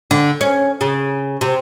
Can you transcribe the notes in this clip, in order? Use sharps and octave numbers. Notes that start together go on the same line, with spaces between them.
D3
C#4
C#3
C3